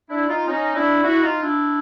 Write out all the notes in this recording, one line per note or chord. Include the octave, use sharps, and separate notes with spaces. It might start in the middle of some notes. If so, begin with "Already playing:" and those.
D4 E4
D#4 F4
C#4 D#4
D4 E4
E4 F#4
D#4 F4
D4 E4